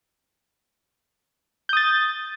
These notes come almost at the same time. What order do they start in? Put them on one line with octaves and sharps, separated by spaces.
G6 D#6 A6